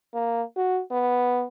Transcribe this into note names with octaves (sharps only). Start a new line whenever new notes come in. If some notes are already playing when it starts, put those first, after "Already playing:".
A#3
F#4
B3